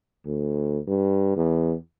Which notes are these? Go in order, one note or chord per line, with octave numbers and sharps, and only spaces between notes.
D2
G2
E2